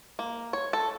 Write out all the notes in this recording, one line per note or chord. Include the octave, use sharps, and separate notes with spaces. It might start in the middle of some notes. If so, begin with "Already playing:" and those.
A#3
C#5
A4